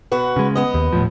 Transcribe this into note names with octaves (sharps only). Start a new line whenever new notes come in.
B2 F#4 B4
C#3 G#3
B3 D#5
D#2
D#1 A2 F3